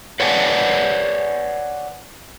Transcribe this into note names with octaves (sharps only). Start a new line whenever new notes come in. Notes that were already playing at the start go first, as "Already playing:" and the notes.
B4 C#5 D5 F#5 G#5 A5